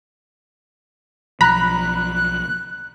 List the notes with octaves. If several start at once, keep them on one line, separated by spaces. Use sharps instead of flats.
B1 F3 A#5 B5 F#6